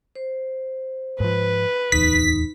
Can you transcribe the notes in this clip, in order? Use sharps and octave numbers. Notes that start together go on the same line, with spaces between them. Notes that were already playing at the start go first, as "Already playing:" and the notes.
C5
G#2 F3 B4
D1 E2 D#4 B6